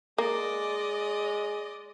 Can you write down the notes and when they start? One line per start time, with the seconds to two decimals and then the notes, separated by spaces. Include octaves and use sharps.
0.18 G#3 A#3 D5 D#5